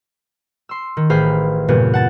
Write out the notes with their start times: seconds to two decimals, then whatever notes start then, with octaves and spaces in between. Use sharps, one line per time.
0.69 C6 E6
0.97 D#3
1.10 A1 G#4 C5 F5 B5 F6
1.68 E2 G2 A#2 C#3 B3
1.94 F#5 A5 A6